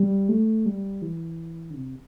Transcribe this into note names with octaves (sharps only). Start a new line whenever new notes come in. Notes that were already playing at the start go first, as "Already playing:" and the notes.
Already playing: G3
A3
G3
E3
D3
C3